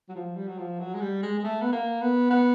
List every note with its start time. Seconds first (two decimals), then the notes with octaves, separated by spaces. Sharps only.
0.09 F#3
0.15 F3
0.35 G3
0.47 F#3
0.58 F3
0.80 F#3
0.94 G#3
1.01 G3
1.23 G#3
1.39 G#3
1.44 A3
1.61 B3
1.72 A#3
2.02 B3
2.30 B3